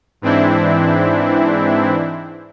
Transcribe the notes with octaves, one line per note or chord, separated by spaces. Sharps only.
G#2 E3 C4 D4 E4